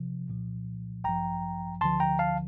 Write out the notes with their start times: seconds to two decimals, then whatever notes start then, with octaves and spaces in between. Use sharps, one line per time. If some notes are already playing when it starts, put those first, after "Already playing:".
Already playing: C3 F3
0.28 C2 A#2 F3
1.04 A1 G2 F3 G5 A#5
1.81 D2 D3 F3 A5 C6
2.00 G5 A#5
2.19 F5 A5